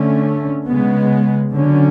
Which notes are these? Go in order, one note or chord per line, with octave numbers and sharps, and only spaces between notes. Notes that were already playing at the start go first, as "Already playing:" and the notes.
Already playing: D3 A3 C#4
C#3 G#3 B3
D3 F#3 C#4